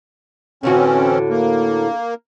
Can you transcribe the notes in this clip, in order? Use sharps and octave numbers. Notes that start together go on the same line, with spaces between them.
A2 D3 E3 C4 C#4 F#4
A#3